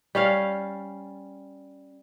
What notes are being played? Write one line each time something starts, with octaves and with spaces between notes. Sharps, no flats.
G3 C#4 F5